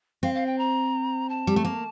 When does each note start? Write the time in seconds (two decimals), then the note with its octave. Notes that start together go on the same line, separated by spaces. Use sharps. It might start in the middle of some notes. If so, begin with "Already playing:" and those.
0.23 C4 F5
0.34 F5
0.46 G5
0.58 A#5
1.29 A5
1.47 G3
1.56 A3
1.65 A#3